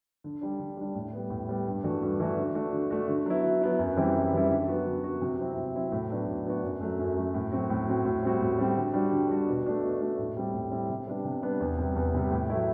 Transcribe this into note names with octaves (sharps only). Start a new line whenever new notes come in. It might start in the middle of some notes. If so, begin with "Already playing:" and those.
D3
G3 D4
D3
G3 D4
A2
G3 B3
A2
G3 B3
G2
E3 A3 D4 F#4
G2
E3 A3 D4 F#4
D3
A3 D4 F#4
D3
A3 D4 F#4
D3
F#3 B3 E4
D3
F#3 B3 E4
F#2
E3 G3 C4 E4
F#2
E3 G3 C4 E4
D3
F#3 B3 F#4
D3
F#3 B3 F#4
C3
F#3 C4 E4
C3
F#3 C4 E4
A2
F#3 B3 D4 F#4
A2
F#3 B3 D4 F#4
F#2
F#3 A3
F#2
F#3 A3
A2
F#3 C4 F#4
A2
F#3 C4 F#4
A2
G3 C4 F#4
A2
G3 C4 F#4
D3
G3 D4 F#4
D3
G3 D4 F#4
B2
A3 D4 F#4
B2
A3 D4 F#4
A2
G3 C4 E4
A2
G3 C4 E4
C3
G3 B3 D4
C3
G3 B3 D4
E2
C3 G3
E2
C3 G3
A2
F#3 A3 E4